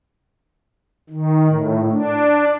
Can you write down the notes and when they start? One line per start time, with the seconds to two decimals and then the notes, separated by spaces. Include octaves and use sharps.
1.09 D#3
1.48 A2
1.91 D4